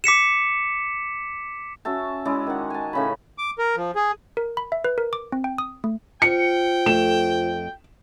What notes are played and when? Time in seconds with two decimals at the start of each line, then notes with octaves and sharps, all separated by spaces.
0.04 D6 B6 C#7 E7
1.85 C#4 F#4 E5 A5
2.25 G#3 C#4 E4 D5
2.47 D#3 F#5
2.70 G#5 A5
2.93 A2 C#3 B5
3.38 D6
3.58 A#4
3.77 F3
3.95 G#4
4.37 A#4
4.57 B5
4.72 E5
4.84 B4
4.98 A#4
5.13 D6
5.32 C4
5.44 G5
5.58 D#6
5.84 A3
6.22 F4 C5 G5 C#7
6.86 F2 A3 E7